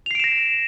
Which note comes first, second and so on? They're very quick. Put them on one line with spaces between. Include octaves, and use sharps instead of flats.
F7 C7 D7 E7 A#6